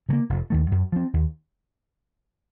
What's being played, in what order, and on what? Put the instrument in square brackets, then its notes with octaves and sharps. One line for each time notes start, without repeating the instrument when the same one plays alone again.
[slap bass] C#3 F#3
A#3
F1
D#2 D#3 A3
F#2
F3 C4
D#2